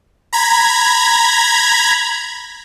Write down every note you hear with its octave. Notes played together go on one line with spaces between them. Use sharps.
A#5 B5 G#6